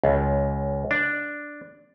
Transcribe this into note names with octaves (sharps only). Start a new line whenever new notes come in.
C#2
D4